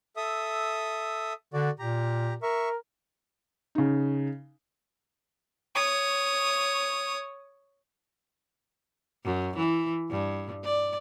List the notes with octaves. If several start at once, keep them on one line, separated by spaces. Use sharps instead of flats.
A4 E5 D#6
D3 F#4 D5
A#2 G4 A#5
A#4 E5 C#6
C#3 D#4
C#5 D#6
F#2
E3
G2
D5